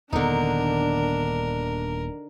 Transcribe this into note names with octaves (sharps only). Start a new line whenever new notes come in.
D#1 D#2 D3 B3 D4 D#4 A#4